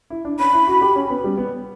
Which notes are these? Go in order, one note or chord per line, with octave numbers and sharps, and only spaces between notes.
E4
D4
C#4 B5
E4
F#4
G4
C#4
B3
G3
B3